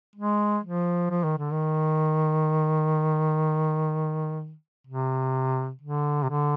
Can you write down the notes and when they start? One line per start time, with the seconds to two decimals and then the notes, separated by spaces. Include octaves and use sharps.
0.16 G#3
0.64 F3
1.10 F3
1.24 D#3
1.38 D3
1.51 D#3
4.87 C3
5.81 D3
6.23 C3
6.29 D3